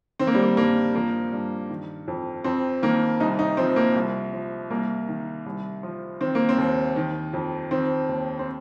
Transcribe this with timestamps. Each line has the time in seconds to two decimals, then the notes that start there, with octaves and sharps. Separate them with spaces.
0.19 D#3 C4
0.27 A#3
0.35 G3
0.42 A#3
0.57 G2 A#3
0.94 F3 A#3
1.32 G2
1.70 D#3
2.08 F2
2.44 F2 C4
2.82 D#3 A#3
3.20 C2 D#4
3.39 D#4
3.57 F3 C4
3.76 A#3
3.95 C2
4.33 F3
4.70 C2 A#3
5.08 D#3
5.46 C2
5.83 F3
6.21 D#3 C4
6.35 A#3
6.49 C4
6.58 D#2
6.96 D#3
7.33 F2
7.71 D#3 C4
8.09 D#2
8.39 C4